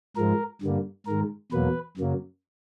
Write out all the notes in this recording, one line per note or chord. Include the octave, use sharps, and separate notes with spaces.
G#2 F3 G#3 A#4
G2 D3 G3 A#3
G#2 D#3 G#3 A#4
E2 B2 F#3 A#3 B4
F#2 C#3 F#3 A#3